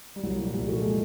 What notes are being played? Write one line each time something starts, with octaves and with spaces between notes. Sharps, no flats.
G3
C2 F#3
A#2
F3 G3
C2
A#2 A3
G#3